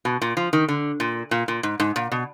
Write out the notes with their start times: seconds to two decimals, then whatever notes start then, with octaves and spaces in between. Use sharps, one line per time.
0.05 B2
0.22 A#2
0.37 F3
0.53 D#3
0.69 D3
1.00 A#2
1.31 A#2
1.48 A#2
1.63 G#2
1.80 G#2
1.96 A#2
2.12 B2